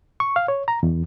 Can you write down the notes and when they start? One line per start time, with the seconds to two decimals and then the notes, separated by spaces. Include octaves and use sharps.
0.20 C#6
0.36 F5
0.48 C#5
0.68 A#5
0.83 E2